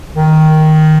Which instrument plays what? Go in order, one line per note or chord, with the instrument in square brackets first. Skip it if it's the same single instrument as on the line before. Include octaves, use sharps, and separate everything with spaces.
[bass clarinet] D#3